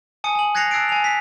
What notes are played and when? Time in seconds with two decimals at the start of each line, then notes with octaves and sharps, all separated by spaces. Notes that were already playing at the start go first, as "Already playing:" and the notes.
0.24 G#5 A5 D#6 C#7
0.35 G#5 F#7
0.55 F#6 G#6 A#6 C7 C#7 F7
0.71 A5 E6 F#6 A6 C7 D7
0.89 G#5 F7
1.04 B6